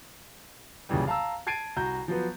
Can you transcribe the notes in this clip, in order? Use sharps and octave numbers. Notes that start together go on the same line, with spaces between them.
C2 F#2 A#2 C#3 E3 G3
F5 A5 A#5 E6
A5 G#6 A6 C7 D7 D#7
C2 F#4 A#5 G6
F3 F#3 B3